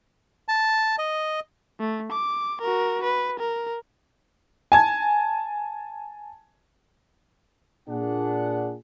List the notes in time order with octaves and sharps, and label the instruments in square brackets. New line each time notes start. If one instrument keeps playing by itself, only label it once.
[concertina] A5
D#5
[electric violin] A3
D6
F#4 A#4
B4
A#4
[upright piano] G#5 A5 G#6
[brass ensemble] A#2 D4 G#4 F#5